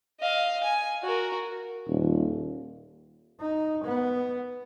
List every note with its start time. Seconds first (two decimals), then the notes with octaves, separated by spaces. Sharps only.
0.20 D#5 F5
0.63 G#5
1.03 F#4 A#4
1.88 D#1
3.40 D#4
3.85 B3